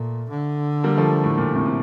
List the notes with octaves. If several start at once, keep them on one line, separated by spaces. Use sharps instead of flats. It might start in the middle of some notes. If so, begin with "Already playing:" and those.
Already playing: A#2 A3
D3
G3 A#3
F3 A3
A2
A#2
A2 C3
C3